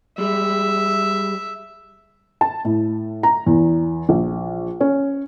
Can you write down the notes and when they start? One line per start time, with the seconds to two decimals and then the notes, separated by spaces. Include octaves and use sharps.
0.18 G3 G#3 E5
2.41 A5
2.65 A2
3.23 A#5
3.46 E2
4.09 A#1
4.81 C#4